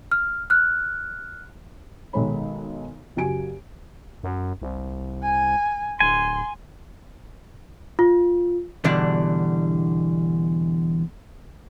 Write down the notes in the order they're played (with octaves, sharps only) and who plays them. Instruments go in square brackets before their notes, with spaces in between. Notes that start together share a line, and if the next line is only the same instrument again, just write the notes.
[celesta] F6
F6 F#6
[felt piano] B1 D#3 G#3 A4 C#5 B5
F#1 F#3 G4 G#5 D7
[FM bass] F#2
C2
[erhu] G#5
[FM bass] D1 [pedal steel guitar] G#5 [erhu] C6
[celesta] F4
[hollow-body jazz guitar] E2 B2 D3 G3 D4 D5